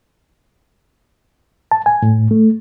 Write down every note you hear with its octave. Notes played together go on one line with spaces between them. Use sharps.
A5
G#5
A2
A3